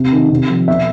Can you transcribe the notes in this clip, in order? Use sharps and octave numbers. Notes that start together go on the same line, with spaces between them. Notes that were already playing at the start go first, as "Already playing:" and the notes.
Already playing: C3
D#3
C3
F3
B2 E5